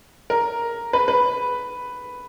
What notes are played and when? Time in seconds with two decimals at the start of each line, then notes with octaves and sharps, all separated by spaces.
0.30 A#4
0.93 B4
1.08 B4